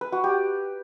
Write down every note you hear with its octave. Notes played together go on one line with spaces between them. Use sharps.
B4
F#4
G4